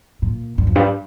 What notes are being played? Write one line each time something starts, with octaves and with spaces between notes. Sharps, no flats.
A#2
G2
F2
G2